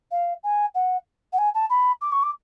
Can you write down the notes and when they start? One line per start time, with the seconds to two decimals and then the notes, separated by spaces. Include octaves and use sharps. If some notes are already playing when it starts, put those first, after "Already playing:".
0.11 F5
0.43 G#5
0.75 F#5
1.33 F#5
1.38 G#5
1.54 A5
1.70 B5
2.01 D6
2.12 C#6
2.23 D6